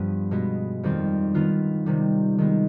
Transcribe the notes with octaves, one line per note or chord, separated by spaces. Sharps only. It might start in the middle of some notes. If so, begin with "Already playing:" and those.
Already playing: G2 F3 B3
B2 G#3 B3
F2 D#3 G3 C4
D#3 B3 F4
C3 D#3 G3
D#3 G#3 B3